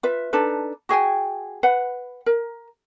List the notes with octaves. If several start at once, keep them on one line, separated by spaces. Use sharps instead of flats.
F4 B4 E5
D4 D#4 A4 B4
F#4 G#4 G5 G#5
B4 F#5
A#4